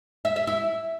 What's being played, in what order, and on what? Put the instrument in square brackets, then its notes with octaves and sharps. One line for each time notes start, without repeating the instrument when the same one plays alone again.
[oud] E5
E5
E4